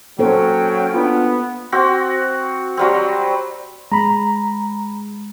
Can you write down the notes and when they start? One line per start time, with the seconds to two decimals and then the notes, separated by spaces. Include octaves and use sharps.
0.19 F#3 A#3 C#4 A4 C5 G5
0.94 B3 D4 F4
1.72 C4 F#4
2.77 F#3 G3 C4
3.92 G#3 A#5 B5